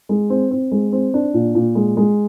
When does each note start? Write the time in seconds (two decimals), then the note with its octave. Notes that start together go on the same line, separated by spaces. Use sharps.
0.09 G#3
0.30 C4
0.51 C4
0.71 G#3
0.92 C4
1.14 D4
1.34 A#2
1.55 A#2
1.75 G#3
1.97 G#3